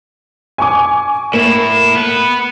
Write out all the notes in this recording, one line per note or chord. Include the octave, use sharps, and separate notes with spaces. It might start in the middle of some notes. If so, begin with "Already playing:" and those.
G#5 C#6 D6
A2 A#3 E4
B3 B4